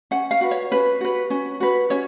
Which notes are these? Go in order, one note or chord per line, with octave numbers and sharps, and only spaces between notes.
C#4 F#5
F5
F#4 B4
C#5
C#4 B4
F#4 B4
C#4
F#4 B4
C#4 C#5